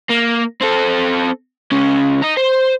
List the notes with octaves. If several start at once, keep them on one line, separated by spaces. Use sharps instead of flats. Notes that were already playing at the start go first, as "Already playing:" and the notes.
A#3
C4 A4
C#2 C#4
D#5 A#5
C5